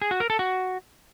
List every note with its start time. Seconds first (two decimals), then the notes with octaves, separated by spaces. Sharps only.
0.02 G#4
0.11 F#4
0.20 A#4
0.30 A4
0.39 F#4